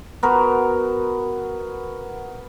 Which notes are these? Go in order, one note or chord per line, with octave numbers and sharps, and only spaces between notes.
B3 F#4 A#4